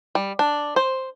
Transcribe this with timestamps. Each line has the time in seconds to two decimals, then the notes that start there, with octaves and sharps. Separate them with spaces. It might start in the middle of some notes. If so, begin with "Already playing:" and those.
0.15 G3
0.39 D4
0.76 C5